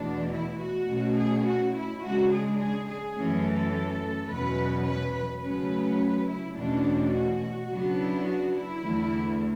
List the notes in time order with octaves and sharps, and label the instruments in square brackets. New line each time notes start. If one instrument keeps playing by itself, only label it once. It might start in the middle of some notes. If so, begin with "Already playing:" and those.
Already playing: [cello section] E2 B2 A3 D4
E4
F#4
B2 A3 C#4
G#4
F#4
E4
C#3 G#3 D4 F#4
G#4
G#4
G#4
F#2 E3 A3 C#4
A4
E2 B2 F#3 C#4 B4
B4
B4
C#3 F#3 A3 C#4 B4
E4
E2 B2 A3 C#4 D4
F#4
C#3 F#3 B3 D4
E4
F#4
E4
E2 D3 A3